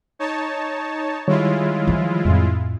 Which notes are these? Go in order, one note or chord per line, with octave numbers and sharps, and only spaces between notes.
D#4 C#5 A5
D#3 G3 G#3 E4 F4 C#5
E3 F3
F2 A2